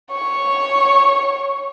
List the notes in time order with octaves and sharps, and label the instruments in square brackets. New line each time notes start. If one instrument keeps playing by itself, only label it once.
[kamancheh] C#5 C#6